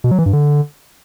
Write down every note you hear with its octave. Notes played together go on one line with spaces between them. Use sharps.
B2
F#3
E3
G2
D3